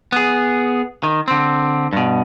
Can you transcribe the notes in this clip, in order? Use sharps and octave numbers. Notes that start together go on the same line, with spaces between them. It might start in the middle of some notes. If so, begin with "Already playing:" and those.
B3 G#4
D#3
D3 C4
G2 B2